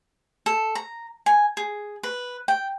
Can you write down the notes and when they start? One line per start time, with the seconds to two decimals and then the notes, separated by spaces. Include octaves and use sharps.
0.46 A4
0.75 A#5
1.26 G#5
1.57 G#4
2.03 B4
2.48 G5